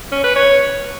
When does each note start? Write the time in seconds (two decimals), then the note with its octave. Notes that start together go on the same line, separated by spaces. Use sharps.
0.12 C#4
0.24 B4
0.36 C#5